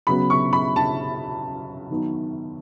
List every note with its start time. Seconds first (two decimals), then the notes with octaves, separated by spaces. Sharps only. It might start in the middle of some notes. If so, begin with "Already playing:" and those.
0.07 C#3 F#3 B3 B5
0.30 C#6
0.53 B5
0.76 A5
1.90 D#3 F#3 B3 D#4